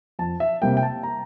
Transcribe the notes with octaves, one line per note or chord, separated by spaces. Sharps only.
F2 A5
E5
C3 G3 A#3 G5
G5
A5
A#5